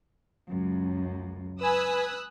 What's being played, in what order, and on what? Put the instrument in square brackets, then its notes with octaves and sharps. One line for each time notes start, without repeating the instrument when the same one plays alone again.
[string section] C#2 F#2
[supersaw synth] B4 G#5 [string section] D#6 E6 F#6